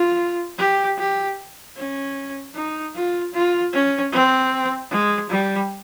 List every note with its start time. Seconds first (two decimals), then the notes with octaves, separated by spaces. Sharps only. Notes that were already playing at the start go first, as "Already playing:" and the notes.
Already playing: F4
0.59 G4
0.98 G4
1.77 C#4
2.55 D#4
2.95 F4
3.34 F4
3.73 C#4
4.12 C4
4.91 G#3
5.30 G3